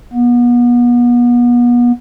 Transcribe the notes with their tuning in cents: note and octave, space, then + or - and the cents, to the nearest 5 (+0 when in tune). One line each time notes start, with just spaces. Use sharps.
B3 -35